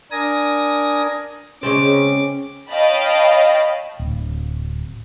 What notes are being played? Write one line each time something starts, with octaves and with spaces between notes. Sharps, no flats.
D4 A#4 G#5 D#6 A#6
C#3 G#3 C4 C#4 D6
C#5 D#5 F5 G5 A5 B5
D1